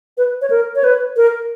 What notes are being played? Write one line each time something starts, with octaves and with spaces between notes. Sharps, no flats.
B4
C#5
A#4
C#5
B4
A#4